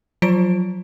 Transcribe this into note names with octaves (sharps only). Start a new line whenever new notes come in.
F3 F#3 F4 C5 D7